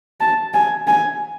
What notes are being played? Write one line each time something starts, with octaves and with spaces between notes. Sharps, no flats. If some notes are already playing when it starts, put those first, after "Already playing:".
A5
G#5
G#5